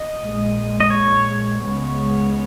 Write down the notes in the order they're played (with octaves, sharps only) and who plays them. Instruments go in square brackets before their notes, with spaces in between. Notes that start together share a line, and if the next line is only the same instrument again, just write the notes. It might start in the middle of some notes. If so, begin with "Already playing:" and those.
Already playing: [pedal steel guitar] D#5
[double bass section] A#1 A#2 G#3
[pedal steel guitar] D#5
C#5
[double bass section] C#2 C#3 G#3 B3